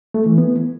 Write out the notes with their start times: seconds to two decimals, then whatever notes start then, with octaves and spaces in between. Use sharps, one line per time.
0.14 A3
0.26 E3
0.38 B3